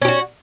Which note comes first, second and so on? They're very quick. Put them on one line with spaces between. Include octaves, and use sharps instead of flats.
C#4 G4 F#4